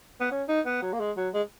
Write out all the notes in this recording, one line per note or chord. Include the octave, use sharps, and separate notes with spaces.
B3
C#4
D#4
B3
F#3
A#3
G#3
F#3
G#3